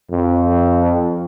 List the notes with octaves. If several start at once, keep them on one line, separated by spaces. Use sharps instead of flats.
F2